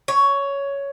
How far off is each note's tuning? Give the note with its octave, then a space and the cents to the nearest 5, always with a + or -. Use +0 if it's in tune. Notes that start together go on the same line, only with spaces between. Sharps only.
C#5 +10